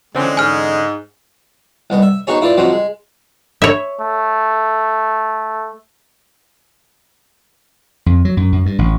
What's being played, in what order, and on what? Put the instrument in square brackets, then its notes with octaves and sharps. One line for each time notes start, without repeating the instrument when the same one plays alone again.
[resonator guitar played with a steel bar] D3 E3 C#4 [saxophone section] F3 C4 [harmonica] G#3
[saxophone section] G#2 [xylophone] G#5 F6
[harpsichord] C2 B3 D#5
E5
G#3 B3 D#4 F#4 G#4 C#5
E4 F4 B4 D5
F3 F#3 G#3 C4 F#4
G#3
[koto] C#5 E5
[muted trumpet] A3
[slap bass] F2
F#3
F#2
F#2
G2
A1